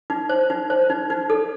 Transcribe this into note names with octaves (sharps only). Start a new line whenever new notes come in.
D#4
C5
D#4
C5
D#4
D#4
A4